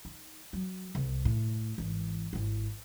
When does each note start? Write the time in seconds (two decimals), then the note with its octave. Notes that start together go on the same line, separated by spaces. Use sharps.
0.05 D#4
0.53 F#3
0.95 C2
1.25 A2
1.78 G#1 E3
2.33 G#1 E4